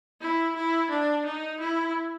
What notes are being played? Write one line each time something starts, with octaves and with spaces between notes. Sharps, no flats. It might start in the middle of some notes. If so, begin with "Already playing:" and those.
E4
E4
D4
D#4
E4